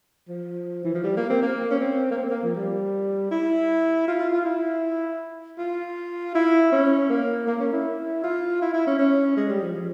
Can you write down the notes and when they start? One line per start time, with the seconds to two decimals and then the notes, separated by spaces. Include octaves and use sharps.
0.28 F3
0.84 E3
0.94 F3
1.04 G3
1.17 A#3
1.30 C4
1.42 A#3
1.71 C#4
1.80 C4
2.11 A#3
2.18 C4
2.30 A#3
2.43 F3
2.56 G3
3.31 E4
4.08 F4
4.19 F4
4.32 F4
4.45 E4
5.58 F4
6.35 E4
6.72 C#4
7.09 A#3
7.47 A#3
7.60 C#4
7.73 E4
8.23 F4
8.62 E4
8.73 E4
8.87 C#4
8.99 C#4
9.37 G#3
9.49 G3
9.62 F3
9.75 F3